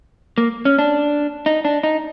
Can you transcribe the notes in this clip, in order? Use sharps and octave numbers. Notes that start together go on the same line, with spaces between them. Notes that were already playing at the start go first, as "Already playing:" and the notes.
A#3
C#4
D4
D#4
D4
D#4